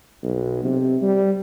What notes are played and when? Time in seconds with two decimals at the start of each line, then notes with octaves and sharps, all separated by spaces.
0.23 B1
0.64 C3
1.02 G3